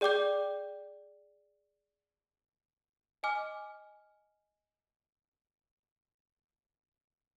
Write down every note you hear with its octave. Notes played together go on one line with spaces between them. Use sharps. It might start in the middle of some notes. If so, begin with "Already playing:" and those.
G#4 D5 G5 D6 G6
D#5 G#5 D6 F6